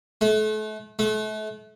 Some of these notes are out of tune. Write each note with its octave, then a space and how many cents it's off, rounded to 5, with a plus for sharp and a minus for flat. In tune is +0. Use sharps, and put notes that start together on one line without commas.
A3 -35
A3 -35